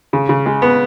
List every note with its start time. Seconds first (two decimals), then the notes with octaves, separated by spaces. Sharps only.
0.13 C#3
0.29 C#3
0.46 G#3
0.62 B3